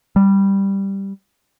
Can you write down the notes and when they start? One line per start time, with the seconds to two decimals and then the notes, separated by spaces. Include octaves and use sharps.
0.16 G3